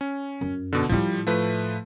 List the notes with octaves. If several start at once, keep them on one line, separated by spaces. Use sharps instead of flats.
C#4
F#2
B2 D3
A2 F3 G3 E4
F3 A3 B4